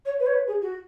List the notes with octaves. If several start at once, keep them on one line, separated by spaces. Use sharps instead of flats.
C#5
B4
C#5
B4
G#4
F#4